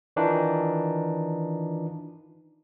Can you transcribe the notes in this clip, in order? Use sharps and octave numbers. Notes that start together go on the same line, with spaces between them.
D#3 E3 D4 D#4 F4